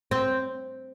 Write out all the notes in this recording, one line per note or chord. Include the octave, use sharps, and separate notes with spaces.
C4